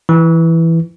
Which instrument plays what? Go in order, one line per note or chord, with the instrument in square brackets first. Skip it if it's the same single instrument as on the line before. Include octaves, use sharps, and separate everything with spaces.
[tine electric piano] E3